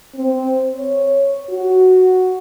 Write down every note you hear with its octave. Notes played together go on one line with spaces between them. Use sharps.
C4
C#5
F#4